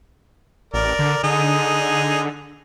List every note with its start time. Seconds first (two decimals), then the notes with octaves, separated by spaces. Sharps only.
0.74 A1 A#4 D5
0.99 D3
1.24 D3 D#4 G#4